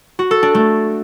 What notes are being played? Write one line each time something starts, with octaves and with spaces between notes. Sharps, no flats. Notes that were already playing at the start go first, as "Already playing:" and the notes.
F#4
A4
D4
A3